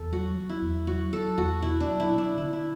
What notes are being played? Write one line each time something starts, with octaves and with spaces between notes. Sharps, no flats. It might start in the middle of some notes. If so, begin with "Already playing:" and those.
Already playing: E2 A4
F#3 F#4
F#3
E4
E2
F#3 F#4
F#3 A4
E2 F#4
B2 E4
D4
F#3
E4
B2
D4
D3 E4
E4